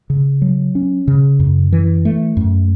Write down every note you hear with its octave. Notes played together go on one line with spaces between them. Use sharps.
C#3
F#3
C#4
C#3
F#2
E3
A3
F#2